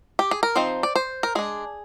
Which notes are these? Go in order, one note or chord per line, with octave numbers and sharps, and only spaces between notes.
G4
G#4
A#4
F3 C4 D#4 C5
D5
C5
A#4
G#3 D4 G#4